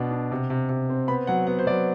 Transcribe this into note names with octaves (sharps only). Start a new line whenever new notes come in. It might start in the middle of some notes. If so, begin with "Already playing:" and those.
Already playing: B2 B3 D4
D4
C3
C3
C3
C4
B3 B5
F#3 F#5
B3 F#5
C5
F#3 D5